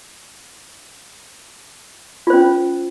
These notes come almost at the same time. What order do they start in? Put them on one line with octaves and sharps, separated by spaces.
F4 C5 C#4